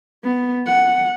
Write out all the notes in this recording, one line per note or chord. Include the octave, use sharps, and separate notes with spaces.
B3
F#5